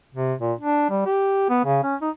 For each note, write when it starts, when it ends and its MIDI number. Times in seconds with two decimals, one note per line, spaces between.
0.14 0.34 48
0.40 0.53 46
0.59 0.88 62
0.90 1.02 55
1.06 1.45 67
1.49 1.60 59
1.65 1.80 49
1.83 1.95 61
2.01 2.10 63